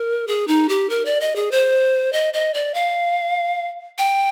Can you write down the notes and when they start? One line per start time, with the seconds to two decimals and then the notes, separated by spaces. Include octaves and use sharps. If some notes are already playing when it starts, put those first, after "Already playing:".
Already playing: A#4
0.27 G#4
0.48 D#4
0.69 G4
0.90 A#4
1.05 D5
1.21 D#5
1.36 G#4
1.51 C5
2.13 D#5
2.34 D#5
2.54 D5
2.74 F5
3.98 G5